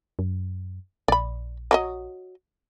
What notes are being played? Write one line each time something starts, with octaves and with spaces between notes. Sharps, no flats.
F#2
A#1 D5 B5
F#3 A4 D#5